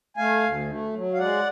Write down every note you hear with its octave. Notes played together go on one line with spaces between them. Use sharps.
A3 F5 G#5
D2
A3
F#3
F5
G#3 D5 F#5